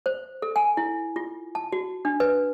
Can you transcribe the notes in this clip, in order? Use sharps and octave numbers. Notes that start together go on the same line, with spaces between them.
C5
A4
G#5
E4
F4
A5
F#4
D4
B4